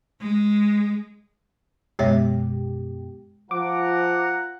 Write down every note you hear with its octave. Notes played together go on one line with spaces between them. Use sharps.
G#3
F#2 B2 G#3 G4 C#5 E5
F3 F4 F#5 A#5 D6